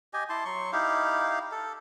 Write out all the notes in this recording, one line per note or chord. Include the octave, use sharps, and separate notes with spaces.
G4 D#5 G#5
E4 A5 C6
F#3 C6 C#6
D#4 E4 G4 F5
A4